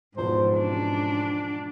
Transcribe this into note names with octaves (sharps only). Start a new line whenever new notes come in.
E2 G#2 B2 F3 C5
C#4 D4